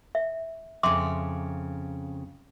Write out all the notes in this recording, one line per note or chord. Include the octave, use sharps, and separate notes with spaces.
E5
F2 C#3 E5 C6 D6